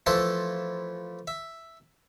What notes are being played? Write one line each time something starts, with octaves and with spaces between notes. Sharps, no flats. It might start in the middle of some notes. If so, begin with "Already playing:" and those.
E3 F3 A3 E4 A5 C6
E5